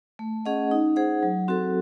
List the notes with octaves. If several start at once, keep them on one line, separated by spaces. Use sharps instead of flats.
A3
C#4 G#4 D#5 F#5
D#4
G#4 C5 F#5
F#3
C4 F#4 A4